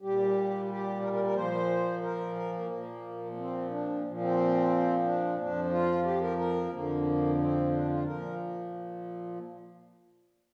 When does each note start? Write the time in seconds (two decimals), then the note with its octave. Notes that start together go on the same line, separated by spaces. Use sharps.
0.01 A#2 G3 G4
0.68 G4
1.02 A#4
1.13 A#4
1.24 A#4
1.35 A#2 F3 C5
2.03 A#4
2.36 A#4
2.53 A#3
2.69 A#2 F3
3.37 C4
3.70 D4
4.03 A#2 F3
4.20 C4
5.04 D4
5.37 F2 F3 D4
5.64 D4
5.70 F4
6.04 G4
6.21 A#4
6.38 A#4
6.71 F2 D3 F3 A#3
7.38 C4
7.72 D4
7.89 F4
8.05 A#2 F3 A#4